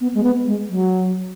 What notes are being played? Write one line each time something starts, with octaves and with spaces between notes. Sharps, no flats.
B3
G#3
B3
G#3
F#3